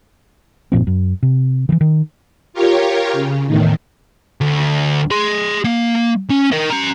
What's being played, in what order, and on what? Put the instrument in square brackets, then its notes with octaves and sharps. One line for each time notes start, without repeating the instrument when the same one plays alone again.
[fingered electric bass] F#1 A#2 F3 C4
F#2
C3
D#3 E3
D#3
[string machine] F4 G4 A#4 C#5
C#3
E2 A2 D#3
[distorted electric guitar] D2
G#4 C6
A#3
C#4
A#4 D#5
C#4 A#5